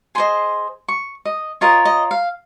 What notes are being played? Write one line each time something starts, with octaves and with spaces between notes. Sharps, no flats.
G#4 C5 D#5 C6
C#6
D#5
F4 A#4 C#5 D#5
D#5
F5